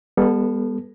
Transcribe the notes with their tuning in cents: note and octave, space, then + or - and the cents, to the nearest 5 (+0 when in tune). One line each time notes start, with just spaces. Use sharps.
G3 +40 B3 -15 A4 +0